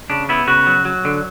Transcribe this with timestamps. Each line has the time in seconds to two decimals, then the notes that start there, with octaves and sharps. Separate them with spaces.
0.10 C#3 D4
0.29 B3 E4
0.47 C#3 F#4
0.67 F#3
0.85 F#3
1.05 D3